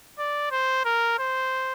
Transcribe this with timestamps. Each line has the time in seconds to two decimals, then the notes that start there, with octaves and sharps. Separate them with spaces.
0.18 D5
0.51 C5
0.85 A#4
1.19 C5